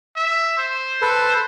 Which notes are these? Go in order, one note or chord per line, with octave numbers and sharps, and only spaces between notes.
E5
C5
A4 B4